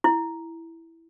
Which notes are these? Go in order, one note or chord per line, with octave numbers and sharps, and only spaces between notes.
E4